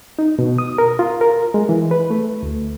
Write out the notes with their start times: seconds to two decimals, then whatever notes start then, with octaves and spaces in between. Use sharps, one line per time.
0.19 D#4
0.39 B2
0.58 D#6
0.78 A#4
0.99 F4
1.21 A#4
1.54 G#3
1.69 E3
1.91 B4
2.10 A3
2.43 D2